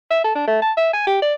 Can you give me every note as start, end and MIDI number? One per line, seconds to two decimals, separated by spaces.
0.11 0.23 76
0.24 0.32 69
0.35 0.47 62
0.47 0.61 57
0.62 0.72 81
0.77 0.93 76
0.93 1.04 80
1.07 1.22 67
1.22 1.34 74